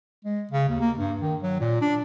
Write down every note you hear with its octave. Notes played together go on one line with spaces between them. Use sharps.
G#3
C#3
D#2
A#3
G2
D#3
F#3
A#2
D4